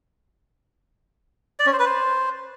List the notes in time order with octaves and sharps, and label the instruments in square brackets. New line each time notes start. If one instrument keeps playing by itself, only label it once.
[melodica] D5
C#4
C5
B4
C5